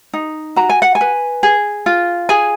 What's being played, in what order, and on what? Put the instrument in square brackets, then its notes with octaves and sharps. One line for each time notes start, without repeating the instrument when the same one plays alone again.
[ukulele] D#4
F#4 A#5
G#5
F#5
G#5
B4
G#4
F4
G#4 G#5